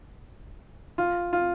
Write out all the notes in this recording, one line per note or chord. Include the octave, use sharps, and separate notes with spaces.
F4
F4